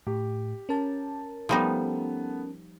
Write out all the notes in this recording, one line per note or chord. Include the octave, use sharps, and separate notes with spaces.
A2 G4
C#4 A#4 A5
F3 G3 A3 B3 D#4